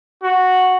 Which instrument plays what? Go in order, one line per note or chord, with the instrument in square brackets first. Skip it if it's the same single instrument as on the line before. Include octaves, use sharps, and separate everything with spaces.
[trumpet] F#4